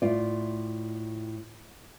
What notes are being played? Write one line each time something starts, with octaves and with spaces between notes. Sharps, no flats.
A2 F4 D5